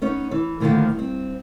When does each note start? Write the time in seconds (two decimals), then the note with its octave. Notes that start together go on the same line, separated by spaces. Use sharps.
0.01 B3 C#4 D#4 C#5
0.31 E3
0.60 A2 D3 D#3 F3 A#3 B3
0.95 G2 C4